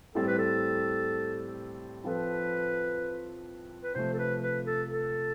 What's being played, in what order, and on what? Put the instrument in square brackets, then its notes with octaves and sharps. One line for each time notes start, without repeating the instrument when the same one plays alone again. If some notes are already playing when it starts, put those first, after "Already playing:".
[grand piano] A2 G3 C4 G4 [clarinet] A4
[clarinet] B4
A4
[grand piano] F3 C4 F4 A4 [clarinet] B4
[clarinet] B4
[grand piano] C3 F3 A3 [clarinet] C5
[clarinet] A4
B4
B4
A4
A4